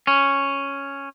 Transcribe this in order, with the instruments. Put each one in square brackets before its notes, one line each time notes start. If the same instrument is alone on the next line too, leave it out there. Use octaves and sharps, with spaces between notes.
[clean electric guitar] C#4